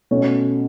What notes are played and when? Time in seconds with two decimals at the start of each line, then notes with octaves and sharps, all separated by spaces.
0.11 B2 A3 C#4